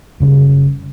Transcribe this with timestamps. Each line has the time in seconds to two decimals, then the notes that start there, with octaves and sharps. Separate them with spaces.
0.20 F#1 C#3 G3